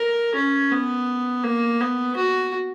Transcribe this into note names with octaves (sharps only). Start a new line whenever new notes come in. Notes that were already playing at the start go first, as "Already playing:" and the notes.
Already playing: A#4
C#4
B3
A#3
B3
F#4